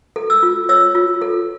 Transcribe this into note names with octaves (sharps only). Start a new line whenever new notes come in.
A4
E6
F4
C#5 E6
F4
A4